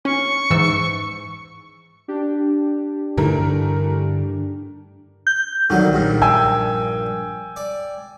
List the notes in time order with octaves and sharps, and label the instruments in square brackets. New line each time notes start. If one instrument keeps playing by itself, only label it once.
[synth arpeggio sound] C#4 [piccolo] C#6
[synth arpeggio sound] G#2 E3 E6
[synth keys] D4 G4
[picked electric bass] G2 D3 G3 [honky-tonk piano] E3 A3 A#4
[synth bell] G6
[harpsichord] C2 D3 F#3 [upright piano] D#3
[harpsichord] A#1 G2 A#2
[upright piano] G5 G#5 E6
[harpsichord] D5